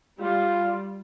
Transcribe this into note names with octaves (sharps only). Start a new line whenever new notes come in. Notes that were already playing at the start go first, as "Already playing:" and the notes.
G3 F4